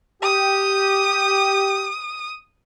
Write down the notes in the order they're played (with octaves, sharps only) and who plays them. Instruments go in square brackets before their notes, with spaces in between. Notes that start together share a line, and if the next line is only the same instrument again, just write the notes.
[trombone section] G4 [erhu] D#6